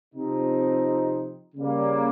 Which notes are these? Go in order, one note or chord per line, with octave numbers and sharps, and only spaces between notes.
C3 F3 C4 D#4
C#3 G3 A#3